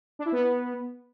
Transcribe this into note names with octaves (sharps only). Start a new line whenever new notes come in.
D4
E4
B3